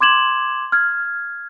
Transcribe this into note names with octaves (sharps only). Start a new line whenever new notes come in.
C6 D6 G#6 E7 F#7
F6 G#6